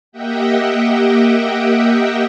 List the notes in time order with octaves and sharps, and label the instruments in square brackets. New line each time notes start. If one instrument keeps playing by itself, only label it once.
[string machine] A#3 G4 D#5 E5 F#5 G5